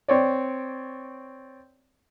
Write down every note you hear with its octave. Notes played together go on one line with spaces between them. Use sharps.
C4 C#5 D5